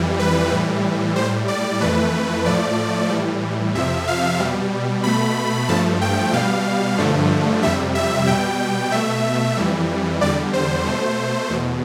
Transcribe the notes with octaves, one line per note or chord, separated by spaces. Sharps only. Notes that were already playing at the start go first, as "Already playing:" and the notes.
Already playing: F2 E3 G3
B4
A2 E3 G3
A2 G3 C5
D5
F2 E3 A3 B4
A2 F3 A3 D5
A2 E3 G3
F2 C3 F3 E5
F5
B2 G3
B2 A3 B5
G2 F3 A3 A5
G5
B2 G3 F5
G2 D3 F3 A3
F2 C3 G3 E5
E5
B2 G3 G5
B2 A3 E5
F2 E3 G3
E2 D3 G3 D5
C5
B2 A3
E2 B2